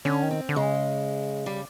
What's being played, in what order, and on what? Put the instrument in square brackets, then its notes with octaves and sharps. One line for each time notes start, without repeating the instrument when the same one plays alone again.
[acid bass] D3 [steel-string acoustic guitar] C#4
[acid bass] D#3
[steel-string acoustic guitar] C4
[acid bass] D3
[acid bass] C#3 [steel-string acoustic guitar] G#3
[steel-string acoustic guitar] G3